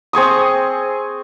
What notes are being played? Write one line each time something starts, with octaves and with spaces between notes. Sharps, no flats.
C4 G#4 C#6 D#6